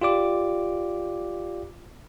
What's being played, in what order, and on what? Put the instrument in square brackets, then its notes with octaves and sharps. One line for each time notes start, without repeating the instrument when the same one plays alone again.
[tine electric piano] F4 G4 D5 D6